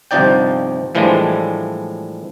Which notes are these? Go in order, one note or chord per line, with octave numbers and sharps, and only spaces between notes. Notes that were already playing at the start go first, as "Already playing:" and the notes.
G1 C3 F3 D#4 D5 G5
A2 E3 F3 G3 G#3 D4